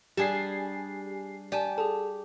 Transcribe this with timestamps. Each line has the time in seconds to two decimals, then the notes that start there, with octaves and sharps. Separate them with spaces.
0.17 G3 D4 G4 G#4 D5 G#5 C7 E7
1.52 G4 D5 G#5 A5
1.78 G#4 A4 A5